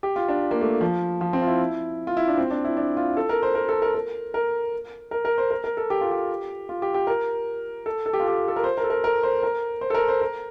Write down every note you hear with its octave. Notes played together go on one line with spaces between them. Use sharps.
G4
F4
D4
A#3
A3
F3
F3
C4
F4
E4
F4
E4
D4
C4
D4
E4
D4
F4
A4
A#4
C5
A#4
A4
A#4
A#4
A#4
A#4
A#4
C5
A#4
A#4
A4
G4
F4
G4
F4
G4
G4
A#4
A4
A4
G4
F4
G4
A4
A#4
C5
A#4
A4
A#4
A#4
C5
A#4
C5
A4
A#4
C5
A#4